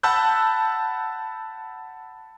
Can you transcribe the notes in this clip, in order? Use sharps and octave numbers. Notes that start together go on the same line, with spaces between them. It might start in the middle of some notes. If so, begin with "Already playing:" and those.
F#5 A5 B5 E6 F#6 G6